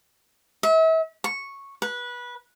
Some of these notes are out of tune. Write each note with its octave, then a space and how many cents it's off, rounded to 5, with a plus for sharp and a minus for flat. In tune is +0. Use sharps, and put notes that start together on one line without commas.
E5 -40
C#6 -5
B4 -20